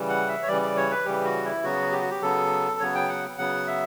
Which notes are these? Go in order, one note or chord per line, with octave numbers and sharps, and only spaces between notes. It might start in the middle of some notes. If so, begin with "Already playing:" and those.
Already playing: C#3 E3 G3
F#5
E5
C#5
C#3 E3 G3 D5
D5
C#5
B4
C#3 E3 G3 G4
F#4
E4
C#3 F#3 B3 F#4
G4
F#4
G4
C#3 F#3 B3 A4
C#3 F#3 B3 C#5
G5
F#5
C#3 F#3 B3 F#5
E5